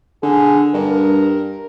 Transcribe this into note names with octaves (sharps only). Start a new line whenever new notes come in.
D3 G#4
G2 A#4